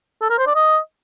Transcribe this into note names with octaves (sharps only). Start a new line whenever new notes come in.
A4
A#4
C5
D5
D#5